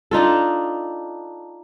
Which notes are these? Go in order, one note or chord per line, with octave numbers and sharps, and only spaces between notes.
D4 D#4 F4 A4